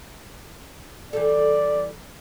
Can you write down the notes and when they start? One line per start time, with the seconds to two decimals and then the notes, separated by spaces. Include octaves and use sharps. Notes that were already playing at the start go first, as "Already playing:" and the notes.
1.13 E3 G3 A4 D5